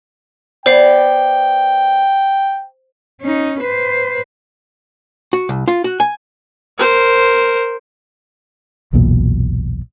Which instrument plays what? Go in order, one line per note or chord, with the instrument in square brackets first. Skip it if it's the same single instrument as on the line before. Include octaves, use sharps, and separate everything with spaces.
[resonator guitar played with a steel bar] B3 D5 [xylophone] C5 C7 [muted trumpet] G5
[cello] C#4 D#4
B4 C5
[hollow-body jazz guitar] F#4
C2
F4
F#4
G#5
[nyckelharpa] A#4 C5
[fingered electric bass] F#1 B1 E2 A#2